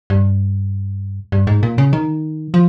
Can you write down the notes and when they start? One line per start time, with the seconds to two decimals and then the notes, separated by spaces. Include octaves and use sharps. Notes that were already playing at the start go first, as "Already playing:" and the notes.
0.10 G2
1.32 G2
1.47 G#2
1.63 A#2
1.78 C#3
1.93 D#3
2.54 F3